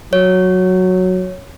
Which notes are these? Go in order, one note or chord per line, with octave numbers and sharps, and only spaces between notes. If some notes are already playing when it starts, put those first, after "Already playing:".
F#3 C#5